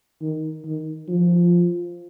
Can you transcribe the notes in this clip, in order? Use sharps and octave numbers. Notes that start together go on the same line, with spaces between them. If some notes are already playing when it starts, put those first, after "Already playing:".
D#3
D#3
F3